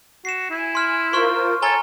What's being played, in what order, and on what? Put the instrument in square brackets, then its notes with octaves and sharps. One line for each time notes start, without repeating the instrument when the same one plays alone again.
[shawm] F#4 [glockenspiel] C7 E7
[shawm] E4 [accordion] G#5
[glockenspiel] C6 F6
[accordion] F4 A#4 C5 [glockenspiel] C6 C#6 F6
[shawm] A4 [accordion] C#5 E6 [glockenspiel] G#5 A#5 G7